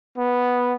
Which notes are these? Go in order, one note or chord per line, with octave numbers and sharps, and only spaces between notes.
B3